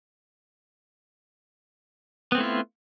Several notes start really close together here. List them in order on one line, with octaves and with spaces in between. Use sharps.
B3 C4 A3 E4 F4